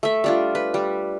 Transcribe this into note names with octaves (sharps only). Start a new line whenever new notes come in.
A3 E5
G3 D4 F4
B4
G3